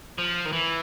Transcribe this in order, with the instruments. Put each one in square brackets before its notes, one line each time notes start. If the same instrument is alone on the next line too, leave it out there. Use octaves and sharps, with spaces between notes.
[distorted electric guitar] F3
D#3
E3